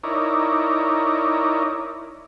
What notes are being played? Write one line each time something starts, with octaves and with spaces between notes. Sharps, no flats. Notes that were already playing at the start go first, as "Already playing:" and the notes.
D#4 E4 A#4 C#5 D5